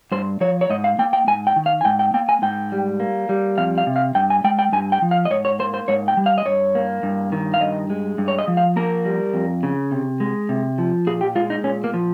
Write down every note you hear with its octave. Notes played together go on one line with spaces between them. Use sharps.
G2 C5
F3 C#5
C#5
G#2 D#5
F5
A#3 G5
G5
G#2 G#5
G5
D#3
F5
G#5
G#2 G5
G5
A#3 G5
G#5
G#2 G5
G3
A#3
G3
F2 F5
F5
C3
F5
G2 G5
G#5
G#3 G5
G5
G2 G#5
G5
F3
F5
D#5
G#2 C#5
C#5
A#3 C5
C5
G#2 C#5
G5
G3
F5
D#5
G2 C#5
A#3
G2
D#3
F5
G2 D#5
G#3
G2
C#5
D#5
F3
F5
A#3 A#4
G3
F2
C#3
C3
G#3
C3
F3
A#2 G#4
G4
G#3 F4
D#4
A#2 C#4
A#3
F3